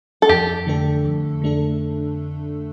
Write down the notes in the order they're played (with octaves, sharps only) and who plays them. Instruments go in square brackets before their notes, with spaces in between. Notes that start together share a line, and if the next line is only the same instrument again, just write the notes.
[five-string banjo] A4
[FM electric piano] F2 [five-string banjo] G4
[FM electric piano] D3 A3 D4 A4
F2
D3 A3 D4 A4